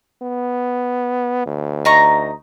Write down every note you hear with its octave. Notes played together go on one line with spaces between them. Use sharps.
B3
D2
D#4 A#5 C#6